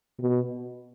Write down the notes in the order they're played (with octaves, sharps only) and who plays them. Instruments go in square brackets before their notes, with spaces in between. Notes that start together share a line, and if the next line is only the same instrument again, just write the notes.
[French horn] B2